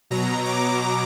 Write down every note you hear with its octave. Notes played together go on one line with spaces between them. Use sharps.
B2 F#3 A#5
D6